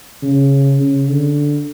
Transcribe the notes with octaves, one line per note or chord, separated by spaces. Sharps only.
C#3
C#3
D3